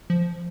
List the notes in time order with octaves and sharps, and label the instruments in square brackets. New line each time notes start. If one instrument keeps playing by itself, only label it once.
[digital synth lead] F3